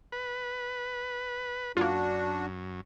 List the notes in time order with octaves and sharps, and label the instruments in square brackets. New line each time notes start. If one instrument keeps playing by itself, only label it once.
[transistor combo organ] B4
[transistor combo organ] F#2 [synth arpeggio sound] A#3 F4 [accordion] D4 F#4